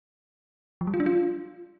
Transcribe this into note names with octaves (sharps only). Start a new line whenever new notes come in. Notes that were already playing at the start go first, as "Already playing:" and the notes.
F3
G3
F4
D4
F4